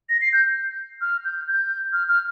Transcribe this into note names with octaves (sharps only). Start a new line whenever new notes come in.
A#6
C7
G6
F6
G6
G6
F6
F6